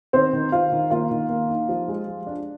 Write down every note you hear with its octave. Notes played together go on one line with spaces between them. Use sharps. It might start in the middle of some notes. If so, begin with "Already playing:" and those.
D#3 C4 C5
D#3
D#3 F4 F5
D#3
A#3 F4 F5
D#3
A#3
D#4
F3
G#3
F3
D4